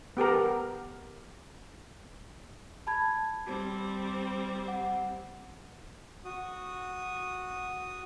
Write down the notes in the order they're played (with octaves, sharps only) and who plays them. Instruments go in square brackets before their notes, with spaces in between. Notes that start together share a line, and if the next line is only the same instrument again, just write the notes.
[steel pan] B3 G4 A4 A#4
[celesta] A5 B5 G#6
[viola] G3 C4
[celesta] F#5
[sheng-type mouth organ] F#4 D#6